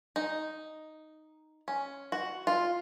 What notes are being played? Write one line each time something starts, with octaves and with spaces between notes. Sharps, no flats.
D#4
C#4
F#4
F4